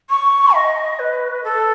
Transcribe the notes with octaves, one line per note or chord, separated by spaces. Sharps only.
C#6
D#5
B4
A4